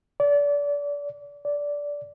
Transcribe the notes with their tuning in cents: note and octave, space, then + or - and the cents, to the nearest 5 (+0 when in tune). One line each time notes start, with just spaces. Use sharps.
D5 -30
D5 -15